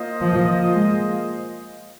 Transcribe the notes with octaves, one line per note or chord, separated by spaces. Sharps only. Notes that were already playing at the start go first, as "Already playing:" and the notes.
Already playing: A#3 F4 C5 D#5
F3
G#3